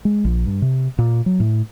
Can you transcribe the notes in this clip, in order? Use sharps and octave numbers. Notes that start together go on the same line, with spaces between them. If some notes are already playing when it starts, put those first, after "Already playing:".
G#3
A#1
G2
C3
A#2
F#3
A2